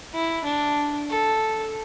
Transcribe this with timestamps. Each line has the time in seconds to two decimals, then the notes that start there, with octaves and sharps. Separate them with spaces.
0.14 E4
0.44 D4
1.10 A4